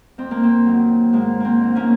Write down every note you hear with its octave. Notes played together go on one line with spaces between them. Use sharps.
F2 C4
A#3
C4
D#3 F#3
G#2 A#3
A#3 C4
D#3 F#3
A#3 C#4